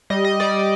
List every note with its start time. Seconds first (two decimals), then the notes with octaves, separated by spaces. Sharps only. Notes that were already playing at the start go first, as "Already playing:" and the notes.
0.10 G3 D#5
0.25 D#5
0.40 G3 D5